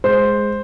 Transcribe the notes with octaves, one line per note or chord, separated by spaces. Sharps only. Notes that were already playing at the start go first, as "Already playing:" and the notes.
G#3 C5